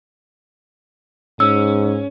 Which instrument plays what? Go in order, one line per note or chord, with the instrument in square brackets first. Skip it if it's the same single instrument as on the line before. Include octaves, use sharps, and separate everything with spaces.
[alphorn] G#2 [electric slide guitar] C#4 [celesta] E6